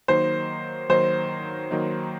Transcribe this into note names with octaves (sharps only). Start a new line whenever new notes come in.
D#3 F#3 A#3 D#4 C5
D#3 F#3 A#3 D#4 C5
D#3 F#3 A#3 D#4